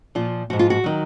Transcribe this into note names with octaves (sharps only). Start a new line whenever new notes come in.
A#2 F3 F4
G#2 F3 F#4
F4
F#4
D#3 F#3